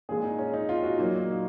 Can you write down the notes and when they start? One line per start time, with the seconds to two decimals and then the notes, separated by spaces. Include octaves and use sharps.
0.09 A#2 F3 G#3 G#4
0.24 D#4
0.38 C#4
0.54 D#4
0.69 F4
0.83 F#4
0.98 A#2 F#3 A#3 D#4